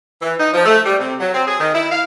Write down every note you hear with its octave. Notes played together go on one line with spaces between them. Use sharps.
E3
D#4
F3
A3
G3
C3
F#3
C4
G#4
D#3
E4
F5